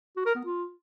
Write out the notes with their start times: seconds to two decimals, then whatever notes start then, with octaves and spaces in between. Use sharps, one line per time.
0.16 F#4
0.26 A#4
0.35 B3
0.45 F4